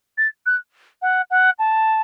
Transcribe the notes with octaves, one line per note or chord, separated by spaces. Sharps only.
A6
F#6
F#5
F#5
A5